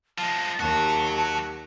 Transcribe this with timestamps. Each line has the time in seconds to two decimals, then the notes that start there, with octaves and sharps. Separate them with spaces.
0.18 F3 G#3 A5
0.60 D#2 F#3 F#4 G4 A5